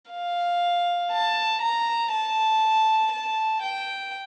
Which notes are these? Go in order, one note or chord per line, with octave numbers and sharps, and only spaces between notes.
F5
A5
A#5
A5
A5
G5